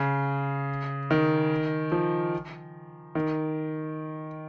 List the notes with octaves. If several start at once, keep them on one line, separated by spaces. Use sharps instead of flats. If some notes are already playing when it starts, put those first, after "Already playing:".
Already playing: C#3
D#3
F3
D#3